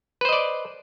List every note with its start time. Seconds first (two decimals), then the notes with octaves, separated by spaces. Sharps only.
0.21 B4
0.25 C5
0.29 D#5
0.33 D5